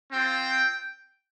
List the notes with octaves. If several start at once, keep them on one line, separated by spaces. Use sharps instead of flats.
C4 F4 G5